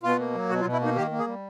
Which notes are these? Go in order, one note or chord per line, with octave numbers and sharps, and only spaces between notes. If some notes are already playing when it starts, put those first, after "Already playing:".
B2 F4
A#3
F#3
B2 F#4
F4
B2
E4
A#3 D#4
D#3 G4
A#3
G#4
G3